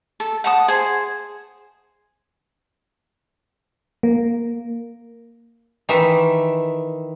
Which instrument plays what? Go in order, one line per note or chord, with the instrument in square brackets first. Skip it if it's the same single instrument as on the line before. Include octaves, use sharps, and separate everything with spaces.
[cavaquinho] A4
F#5 A5 D#6
G#4 C5
[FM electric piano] A#3
[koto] D#3 E3 E5